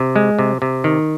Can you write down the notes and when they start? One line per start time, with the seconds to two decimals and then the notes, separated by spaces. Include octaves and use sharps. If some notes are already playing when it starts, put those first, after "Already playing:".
Already playing: C3
0.16 G#3
0.39 C3
0.62 C3
0.84 D#3